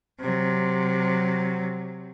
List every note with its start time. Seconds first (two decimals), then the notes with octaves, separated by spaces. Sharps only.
0.20 C3 F#3